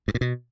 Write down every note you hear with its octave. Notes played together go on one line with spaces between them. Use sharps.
G2
A#2
B2